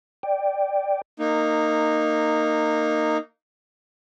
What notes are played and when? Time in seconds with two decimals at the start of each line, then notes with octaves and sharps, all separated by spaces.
0.23 D5 G5
1.18 A#3 D#4